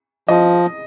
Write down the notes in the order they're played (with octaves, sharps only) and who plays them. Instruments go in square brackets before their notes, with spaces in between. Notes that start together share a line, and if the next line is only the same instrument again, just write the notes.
[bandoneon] F3 [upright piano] D#5